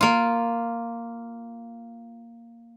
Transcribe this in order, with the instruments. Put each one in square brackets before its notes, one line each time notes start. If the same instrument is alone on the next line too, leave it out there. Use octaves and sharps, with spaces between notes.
[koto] A#3 F4